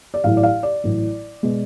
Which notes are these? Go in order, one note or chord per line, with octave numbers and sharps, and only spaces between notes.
D5
A1 A2 F#3 F5
D5
F5
D5
A1 A2 F#3
B2 G#3